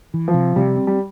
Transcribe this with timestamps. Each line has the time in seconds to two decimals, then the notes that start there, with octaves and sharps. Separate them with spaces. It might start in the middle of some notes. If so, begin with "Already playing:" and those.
0.14 E3
0.28 F3
0.34 C3
0.56 C3 G3
0.77 C4
0.87 G3